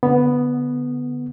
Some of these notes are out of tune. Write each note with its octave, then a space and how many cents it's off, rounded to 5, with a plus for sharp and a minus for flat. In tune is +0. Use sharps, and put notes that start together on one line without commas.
D3 -10 B3 +0